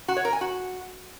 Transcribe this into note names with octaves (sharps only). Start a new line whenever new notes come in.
F#4
C#5
A#4
G#5
F#4